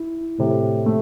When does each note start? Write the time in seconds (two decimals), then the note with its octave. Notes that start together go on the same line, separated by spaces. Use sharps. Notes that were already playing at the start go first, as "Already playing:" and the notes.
Already playing: E4
0.39 A2 C3
0.86 A3